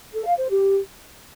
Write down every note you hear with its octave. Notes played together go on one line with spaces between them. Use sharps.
A4
F5
C5
G4